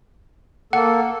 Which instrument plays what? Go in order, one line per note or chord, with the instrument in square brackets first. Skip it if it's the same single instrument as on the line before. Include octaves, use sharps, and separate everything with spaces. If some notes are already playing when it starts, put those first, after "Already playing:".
[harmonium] A#3 A4 [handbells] F#5